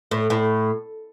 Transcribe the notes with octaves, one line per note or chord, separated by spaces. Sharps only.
A2
A2